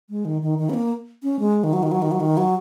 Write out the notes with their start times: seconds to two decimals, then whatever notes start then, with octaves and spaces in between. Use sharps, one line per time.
0.10 G#3
0.25 D#3
0.42 D#3
0.59 D#3
0.70 C#4
0.74 A#3
1.23 C#4
1.39 G#3
1.64 D#3
1.73 F#3
1.83 D#3
1.92 F#3
2.02 D#3
2.11 F#3
2.20 D#3
2.37 F#3